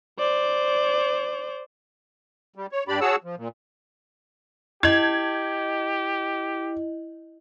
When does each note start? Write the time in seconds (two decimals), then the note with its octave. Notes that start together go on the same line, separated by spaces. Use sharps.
0.19 C5 D5
2.55 G3
2.72 C#5
2.88 G2 D4 G4 D5 B5
3.01 F#4 G#4 C#5 F#5 A5 E6
3.24 F3
3.37 A#2
4.83 E4 G4 D#5 G#6